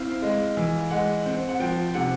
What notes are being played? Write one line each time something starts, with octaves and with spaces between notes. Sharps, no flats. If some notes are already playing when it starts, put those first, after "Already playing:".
Already playing: C4 E4 F5
G#3
E3
G#3 F#5
C4
F#5
F3 G5
C3 F#5